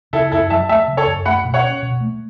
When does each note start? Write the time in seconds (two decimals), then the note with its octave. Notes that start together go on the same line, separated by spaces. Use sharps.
0.13 C#3 E4 A4
0.32 F#2 E4 A4
0.50 F#3 E5 A5
0.69 A3 E5 A5
0.88 C#3
0.97 A4 C#5
1.07 F#2
1.25 A3 F#5 B5
1.44 B2
1.54 C#5 F#5
1.64 C#4
1.82 B2
2.00 A3